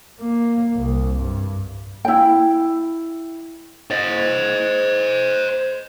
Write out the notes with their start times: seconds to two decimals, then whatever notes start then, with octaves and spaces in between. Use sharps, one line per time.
0.20 A#3
0.76 C2
1.17 G2
2.05 E4 G5
3.91 C5 D#5